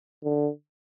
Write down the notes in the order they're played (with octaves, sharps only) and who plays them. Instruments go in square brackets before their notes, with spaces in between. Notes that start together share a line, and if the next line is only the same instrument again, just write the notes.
[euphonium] D3